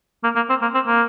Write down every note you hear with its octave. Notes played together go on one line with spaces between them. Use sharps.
A#3
A#3
C4
A#3
C4
A#3